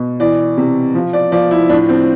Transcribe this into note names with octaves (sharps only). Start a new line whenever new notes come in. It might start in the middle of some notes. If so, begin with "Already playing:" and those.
Already playing: B2
E3 D5
C3
F3
D5
F3 D5
E4
A2 D4
C4